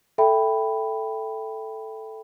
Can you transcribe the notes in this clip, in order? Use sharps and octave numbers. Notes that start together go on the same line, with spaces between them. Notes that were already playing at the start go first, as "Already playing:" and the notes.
A4 E5 G5 B5